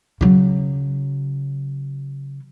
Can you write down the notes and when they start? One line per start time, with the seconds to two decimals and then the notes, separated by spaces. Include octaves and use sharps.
0.21 C#3 F#3